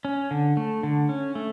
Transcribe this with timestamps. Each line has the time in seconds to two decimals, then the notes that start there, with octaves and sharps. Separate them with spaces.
0.05 C#4
0.31 D3
0.57 A3
0.83 D3
1.09 C#4
1.35 A3